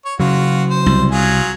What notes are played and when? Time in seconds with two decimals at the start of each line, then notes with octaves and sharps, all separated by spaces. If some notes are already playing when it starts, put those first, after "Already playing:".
0.05 C#5
0.20 C#3 F#3 F4 F#4
0.70 C5
0.86 C2
1.11 F#3 F4 G#4